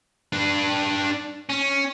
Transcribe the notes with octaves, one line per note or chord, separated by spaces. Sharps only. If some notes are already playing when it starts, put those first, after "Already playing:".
D4 B4
C#4